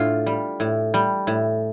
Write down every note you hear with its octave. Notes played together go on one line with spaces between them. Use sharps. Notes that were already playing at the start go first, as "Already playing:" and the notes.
Already playing: A2 D4 F4
G3
A2
G3
A2